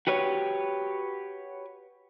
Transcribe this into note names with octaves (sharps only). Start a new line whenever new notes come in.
F#4 G4 B4 C#5